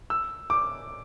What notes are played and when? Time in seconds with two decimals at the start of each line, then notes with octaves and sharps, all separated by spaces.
0.10 E6
0.50 D6